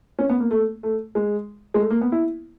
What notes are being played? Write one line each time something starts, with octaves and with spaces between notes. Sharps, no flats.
C#4
B3
A#3
A3
A3
G#3
G#3
A3
A#3
B3
E4